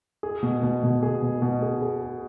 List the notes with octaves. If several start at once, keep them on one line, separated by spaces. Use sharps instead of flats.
G#4
B2
B2
B2
G#4
B2
B2
G#4
G#4
G#4